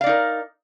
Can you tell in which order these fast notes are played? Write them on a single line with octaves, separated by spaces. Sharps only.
F5 D5 D#4 A#4